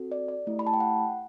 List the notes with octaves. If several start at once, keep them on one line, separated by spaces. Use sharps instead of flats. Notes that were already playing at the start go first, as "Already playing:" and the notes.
Already playing: C4 F#4 A4
D5
D5
A3 E4 G4
B5
A5
G5
F#5